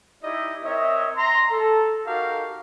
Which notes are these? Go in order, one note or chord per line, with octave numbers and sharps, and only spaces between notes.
D#4 E4 G4 D5 D#5
C4 A#4 C#5 D#5 E5
A#5 C6
A4
D#4 F#4 G4 A4 A#4 F5